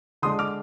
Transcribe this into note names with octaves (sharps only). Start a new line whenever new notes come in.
D3 G#3 D4 C6 D#6
D6 F6